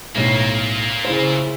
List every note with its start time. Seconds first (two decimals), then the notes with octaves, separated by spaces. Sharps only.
0.15 B1 A2 A#3 F4
1.05 C#3 E4 C5